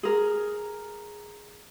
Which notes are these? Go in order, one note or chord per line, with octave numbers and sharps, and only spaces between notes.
G#4 A#4